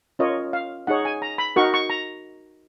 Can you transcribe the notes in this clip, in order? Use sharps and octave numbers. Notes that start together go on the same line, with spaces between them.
C#4 F4 A#4 C#5 D#5
F5
D#4 G#4 C#5 F#5
G#5
A#5
B5
D#4 F#4 A#4 C#6
C#6
A#5